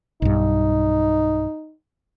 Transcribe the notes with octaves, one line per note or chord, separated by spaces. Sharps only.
B1 G2 D#4